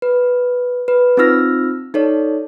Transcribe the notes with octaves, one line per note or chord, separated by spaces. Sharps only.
B4
B4
C4 D#4 F4 E6 F6 A#6
D#4 A4 C#5 D5